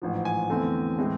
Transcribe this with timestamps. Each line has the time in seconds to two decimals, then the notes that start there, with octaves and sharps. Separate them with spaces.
0.02 A1 G#2 F3
0.25 G#5
0.50 E2 D3 A3 C4
0.98 A2 E3 G#3 C4